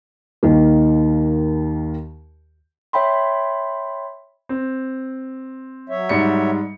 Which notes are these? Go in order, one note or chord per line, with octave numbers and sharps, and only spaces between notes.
D#2 D#3 A#3
C#5 E5 G5 B5 C6
C4
F#3 C#5 E5
G#2 G3 C#7